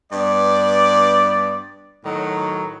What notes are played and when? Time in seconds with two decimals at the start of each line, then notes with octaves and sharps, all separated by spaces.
0.12 G2 B3 D5
2.05 A2 D#3 F#3